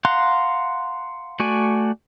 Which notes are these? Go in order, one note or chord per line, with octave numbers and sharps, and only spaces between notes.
F5 F#5 A#5 C6 F#6
A3 F#4 D5 G#5